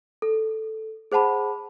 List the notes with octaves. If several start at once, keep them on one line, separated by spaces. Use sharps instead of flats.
A4
G#4 C5 F#5 A5 B5